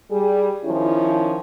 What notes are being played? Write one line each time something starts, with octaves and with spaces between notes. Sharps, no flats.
G3 G#4
D#3 F3 C#4 E4